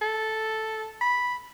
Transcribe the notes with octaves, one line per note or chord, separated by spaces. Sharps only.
A4
B5